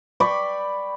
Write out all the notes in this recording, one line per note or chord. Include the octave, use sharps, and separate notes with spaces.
D5 G5 B5 C#6